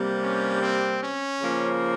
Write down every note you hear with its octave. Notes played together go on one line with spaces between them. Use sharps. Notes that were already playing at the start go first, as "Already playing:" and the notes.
Already playing: C3 G3 A#3
C#4
C4
C#4
C#3 F3 A#3